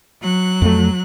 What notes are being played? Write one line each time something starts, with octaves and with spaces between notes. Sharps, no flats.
F#3 F#6
F2 A3